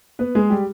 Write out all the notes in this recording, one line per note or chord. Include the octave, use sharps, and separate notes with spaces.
B3 B4
G#3 G#4
G3 G4